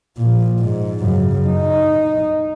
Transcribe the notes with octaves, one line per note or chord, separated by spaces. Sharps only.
A#2 F3
G#2
F#2 C#3
D#4